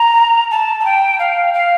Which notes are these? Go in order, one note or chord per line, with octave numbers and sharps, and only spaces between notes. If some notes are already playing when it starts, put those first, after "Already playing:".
Already playing: A#5
A5
A5
G5
F5
F5